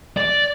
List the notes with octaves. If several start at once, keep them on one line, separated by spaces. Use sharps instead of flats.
D5